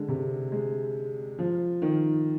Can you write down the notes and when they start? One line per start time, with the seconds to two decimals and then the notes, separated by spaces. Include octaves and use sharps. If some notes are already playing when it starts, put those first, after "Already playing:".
Already playing: D3 G#3
0.08 C3
0.52 G#3
1.39 F3
1.82 D#3